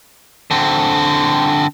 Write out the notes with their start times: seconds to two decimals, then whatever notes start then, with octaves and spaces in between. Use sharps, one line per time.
0.51 D3 C4